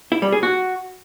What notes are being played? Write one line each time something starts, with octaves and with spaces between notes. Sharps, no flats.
E4
G3
G#4
F#4